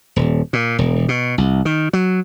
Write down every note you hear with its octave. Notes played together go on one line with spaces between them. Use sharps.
D#1
A#2
E1
B2
C2
D#3
F#3